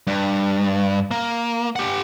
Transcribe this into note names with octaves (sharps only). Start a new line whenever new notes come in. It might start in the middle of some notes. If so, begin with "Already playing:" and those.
G2
A#3
G4 F#5